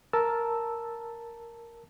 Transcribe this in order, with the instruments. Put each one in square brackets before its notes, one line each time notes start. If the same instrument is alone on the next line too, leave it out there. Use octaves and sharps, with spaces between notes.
[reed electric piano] A#4 A5 E6